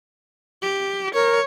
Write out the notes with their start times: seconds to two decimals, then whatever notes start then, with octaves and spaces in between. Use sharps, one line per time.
0.63 G4
1.14 A#4 C#5